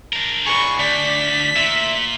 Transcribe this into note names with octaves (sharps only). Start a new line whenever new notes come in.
D4 A#4
G#4 B4 C#6
D2 D4 B6
A#2 E5